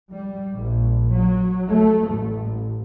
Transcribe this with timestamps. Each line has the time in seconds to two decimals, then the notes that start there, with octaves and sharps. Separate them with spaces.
0.12 G3
0.58 A#1
1.11 F#3
1.68 A3
2.10 A1